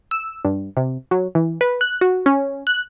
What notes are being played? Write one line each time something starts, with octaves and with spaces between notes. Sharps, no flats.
E6
G2
C3
F#3
E3
B4
F#6
F#4
C#4
F#6